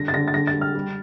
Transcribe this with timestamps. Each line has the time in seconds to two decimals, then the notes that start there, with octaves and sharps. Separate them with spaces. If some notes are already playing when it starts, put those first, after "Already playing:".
Already playing: D3 G3 A#6
0.08 A6
0.13 D3 A#6
0.28 A6
0.34 D3 A#6
0.47 A6
0.54 G3
0.61 F6
0.74 G3